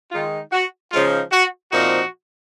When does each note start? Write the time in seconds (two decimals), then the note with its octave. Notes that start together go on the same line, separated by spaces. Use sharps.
0.11 D#3 G#3 D#4 F4
0.52 F#4
0.91 C#3 F3 G#3 D#4 F4
1.32 F#4
1.72 A#2 F3 C4 D#4 F#4